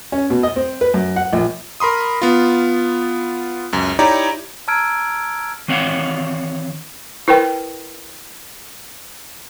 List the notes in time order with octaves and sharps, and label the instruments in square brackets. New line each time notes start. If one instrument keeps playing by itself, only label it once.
[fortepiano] C#4
B2
D#5
C4
B4
F#2
F#5
A#1
[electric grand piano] A#4 B5 C6 D#6
B3 F4
C#2 F#2
D#4 E4 G4 C#5 D5 A#5
[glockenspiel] A5 A#5 E6 F6 G#6 D7
[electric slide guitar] D#3 E3 C4 C#5 F5 F#5
[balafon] E4 A#4 B4 G5